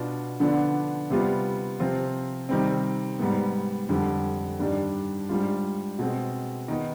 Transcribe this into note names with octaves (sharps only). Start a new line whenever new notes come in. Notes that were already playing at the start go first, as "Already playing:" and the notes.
Already playing: B2 B3 D4 F4
D3 F3 B3 D4
C3 G3 B3 F4
C3 F3 C4 F4
C3 D#3 G3 C4
G#2 G3 B3
F2 D3 G3
G2 D#3 G3 D4
G#2 G3 D4 F4
B2 G#3 C4
D#3 B3 D#4